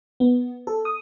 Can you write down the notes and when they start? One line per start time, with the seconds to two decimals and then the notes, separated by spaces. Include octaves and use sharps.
0.20 B3
0.67 A4
0.85 D#6